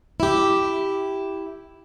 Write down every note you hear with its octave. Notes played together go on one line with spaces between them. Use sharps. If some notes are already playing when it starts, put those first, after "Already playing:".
E4 G4